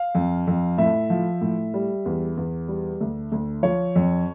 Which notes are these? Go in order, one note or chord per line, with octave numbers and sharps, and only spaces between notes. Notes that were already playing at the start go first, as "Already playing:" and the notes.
Already playing: F5
F2
F2
A2 E5
F3
A2
G3
E2
E2
G3
D2
D2
F3 C#5
F2